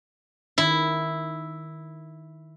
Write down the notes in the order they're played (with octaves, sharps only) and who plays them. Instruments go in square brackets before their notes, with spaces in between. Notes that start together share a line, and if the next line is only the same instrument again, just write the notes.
[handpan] D#3 [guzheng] E4